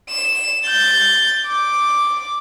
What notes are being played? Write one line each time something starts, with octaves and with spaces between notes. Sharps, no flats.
E7
G6 A6
D6